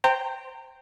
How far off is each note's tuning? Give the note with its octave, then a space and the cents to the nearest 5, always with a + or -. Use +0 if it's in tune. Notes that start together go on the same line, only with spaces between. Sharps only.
C5 +0 G5 +0 A#5 -30